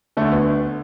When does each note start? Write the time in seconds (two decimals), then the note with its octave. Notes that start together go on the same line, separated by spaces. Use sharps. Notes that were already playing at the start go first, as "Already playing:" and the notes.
0.17 D2 D3 A3
0.32 B3